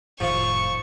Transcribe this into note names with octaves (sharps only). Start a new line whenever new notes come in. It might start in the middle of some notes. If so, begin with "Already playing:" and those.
F1 A2 D#3 F3 F4 C#6